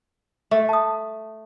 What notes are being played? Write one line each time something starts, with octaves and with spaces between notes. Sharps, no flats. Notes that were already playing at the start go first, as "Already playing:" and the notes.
A3
A5 D#6